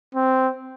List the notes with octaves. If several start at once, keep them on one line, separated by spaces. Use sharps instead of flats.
C4